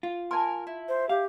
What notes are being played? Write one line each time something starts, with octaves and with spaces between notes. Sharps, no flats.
F4
A#4 G#5 A5 C6
E4
C5
G4 F5